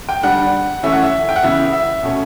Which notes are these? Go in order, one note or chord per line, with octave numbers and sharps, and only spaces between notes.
G5
D3 G3 D4 F#5
E3 A3 C#4 E5
F#5
E5
G5
F#5
C#3 E3 B3 E5
E5
B2 A3 C#4